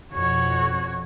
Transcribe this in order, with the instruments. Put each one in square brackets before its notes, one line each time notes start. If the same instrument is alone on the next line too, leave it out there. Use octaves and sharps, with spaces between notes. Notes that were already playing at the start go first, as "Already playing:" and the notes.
[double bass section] F2 B2 [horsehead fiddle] F#4 C#5